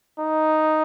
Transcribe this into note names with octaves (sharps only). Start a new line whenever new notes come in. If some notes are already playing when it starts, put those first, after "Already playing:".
D#4